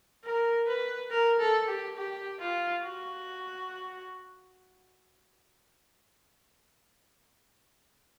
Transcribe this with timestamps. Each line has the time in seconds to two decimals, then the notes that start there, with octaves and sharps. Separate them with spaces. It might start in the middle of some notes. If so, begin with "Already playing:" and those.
0.25 A#4
0.67 B4
1.11 A#4
1.40 A4
1.68 G4
1.97 G4
2.40 F4
2.83 F#4